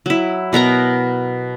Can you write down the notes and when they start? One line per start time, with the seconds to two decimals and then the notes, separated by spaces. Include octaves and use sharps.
0.06 F#3 E4
0.53 B2 B3 A#4 A#5